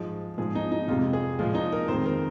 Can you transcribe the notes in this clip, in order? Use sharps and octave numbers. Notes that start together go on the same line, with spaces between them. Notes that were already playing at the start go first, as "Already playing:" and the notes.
Already playing: G#2 F3 G#3
G#2 F3 G#3 G#4
D#4
D#4
F2 C3 G#3 F4
G#4
A#2 F3 G#3 F4
D#4
A#4
F2 D#3 G#3 C5
A#4